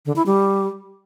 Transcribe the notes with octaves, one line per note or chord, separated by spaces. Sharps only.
D3
E4
G3